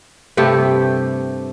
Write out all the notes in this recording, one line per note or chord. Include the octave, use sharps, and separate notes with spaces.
G2 C3 A3 G4